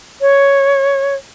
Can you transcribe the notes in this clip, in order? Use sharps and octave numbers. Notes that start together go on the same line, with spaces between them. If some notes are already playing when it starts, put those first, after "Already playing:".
C#5